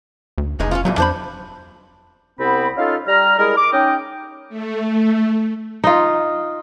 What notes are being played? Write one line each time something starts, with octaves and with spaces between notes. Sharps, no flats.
D2
F1 C#2 G#3 D#4
C#4 D#4 F4
C2 F2 A#2 F#3
F2 D4 C5 B5
C2 B3 C4 B5
C#4 D#4 F4 A4 F5
G3 A#5 F6
G3 G#3 E4 G#4 A#4
D6
C#4 D#4 D#5 G5
A3
D#4 F4